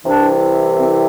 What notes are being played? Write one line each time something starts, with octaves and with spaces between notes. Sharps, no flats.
C2 C3 E3 D4
C4